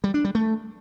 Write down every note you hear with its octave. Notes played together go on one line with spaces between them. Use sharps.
G3
D4
G3
A3